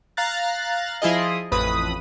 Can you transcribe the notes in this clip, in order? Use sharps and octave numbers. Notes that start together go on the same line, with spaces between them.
F5 A#5 F#6 A6
F3 E4 F4 G#4 D#5
A1 F2 B4 B5 D#6